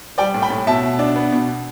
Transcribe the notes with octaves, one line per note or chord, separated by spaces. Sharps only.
G3 D5 G5
A2
G5 B5
A2
B2 E5 A5
B2
D4
B3
B2